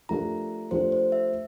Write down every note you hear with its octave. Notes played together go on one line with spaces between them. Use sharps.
F3 A3 D4 G4 A#4 A#5
F3 A3 D4 G4 A#4 C5
C5
E5